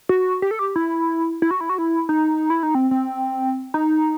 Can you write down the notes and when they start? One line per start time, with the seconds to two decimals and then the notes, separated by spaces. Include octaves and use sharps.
0.09 F#4
0.42 G4
0.51 A4
0.59 G4
0.76 E4
1.42 E4
1.51 F#4
1.61 E4
1.70 F#4
1.78 E4
2.09 D#4
2.50 E4
2.63 D#4
2.75 C4
2.91 C4
3.74 D#4